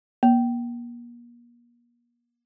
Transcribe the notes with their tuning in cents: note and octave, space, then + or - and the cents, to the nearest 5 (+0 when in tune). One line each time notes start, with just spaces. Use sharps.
A#3 +40